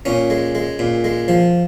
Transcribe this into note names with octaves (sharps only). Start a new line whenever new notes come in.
A#2 C#4
G#3
G#3
A#2
G#3
F3